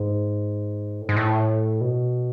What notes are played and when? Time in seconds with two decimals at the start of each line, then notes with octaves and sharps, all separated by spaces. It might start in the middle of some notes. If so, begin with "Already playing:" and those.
Already playing: G#2
1.02 A2
1.09 G#2
1.16 A2
1.81 B2